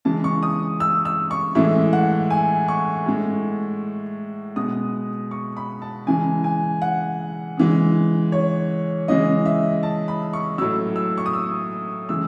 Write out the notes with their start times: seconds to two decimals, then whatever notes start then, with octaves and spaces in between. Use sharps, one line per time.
0.05 C#3 E3 G#3 A5
0.24 C#6
0.43 D#6
0.80 E6
1.05 E6
1.31 C#6
1.55 A2 E3 G#3 E5
1.93 F#5
2.30 G#5
2.68 C#6
3.06 A2 G#3
4.56 B2 G#3 D#6
5.31 C#6
5.57 B5
5.82 A5
6.06 C#3 E3 G#3 G#5
6.44 G#5
6.82 F#5
7.57 C#3 E3 G#3
8.32 C#5
9.08 C#3 E3 G#3 D#5
9.46 E5
9.83 A5
10.08 B5
10.33 C#6
10.58 A2 F#3 E6
10.96 E6
11.18 C#6
11.26 D#6
11.33 E6
12.09 C#3 E3 G#3 E6